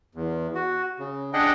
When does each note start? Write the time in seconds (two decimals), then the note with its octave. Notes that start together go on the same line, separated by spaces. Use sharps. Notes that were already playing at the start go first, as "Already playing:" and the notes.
0.15 E2
0.55 F#4
0.99 C#3
1.34 D4 G#4 D#5 F#5 G5